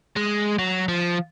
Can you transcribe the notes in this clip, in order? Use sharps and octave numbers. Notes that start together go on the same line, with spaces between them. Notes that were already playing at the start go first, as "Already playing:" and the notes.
G#3
F#3
F3